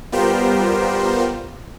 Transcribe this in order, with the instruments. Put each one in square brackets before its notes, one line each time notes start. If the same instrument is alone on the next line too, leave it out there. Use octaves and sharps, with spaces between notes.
[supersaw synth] G3 B3 F4 G4 A#4 C5